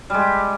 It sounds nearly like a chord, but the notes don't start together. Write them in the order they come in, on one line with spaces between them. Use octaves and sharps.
G3 G#3 G4